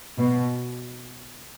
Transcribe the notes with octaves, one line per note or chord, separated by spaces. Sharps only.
B2